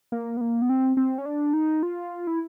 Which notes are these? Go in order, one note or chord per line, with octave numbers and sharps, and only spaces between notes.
A#3
B3
A#3
B3
C4
C4
C#4
D4
D#4
F4
E4